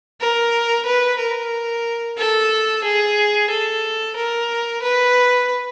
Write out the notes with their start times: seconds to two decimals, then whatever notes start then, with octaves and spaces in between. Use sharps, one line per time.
0.21 A#4
0.86 B4
1.20 A#4
2.18 A4
2.84 G#4
3.50 A4
4.16 A#4
4.83 B4